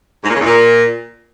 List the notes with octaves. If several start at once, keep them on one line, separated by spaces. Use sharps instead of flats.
G#2
A#2
C#3
E2
A#2